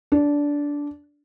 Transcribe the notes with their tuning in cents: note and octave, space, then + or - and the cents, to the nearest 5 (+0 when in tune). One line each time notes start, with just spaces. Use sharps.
D4 -15